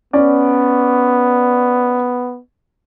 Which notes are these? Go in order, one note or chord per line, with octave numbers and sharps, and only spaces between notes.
B3 C#4 D5